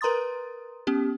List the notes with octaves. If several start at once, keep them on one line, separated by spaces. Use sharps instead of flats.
A#4 B4 A#5 C6 D#6 A6
B3 C#4 G4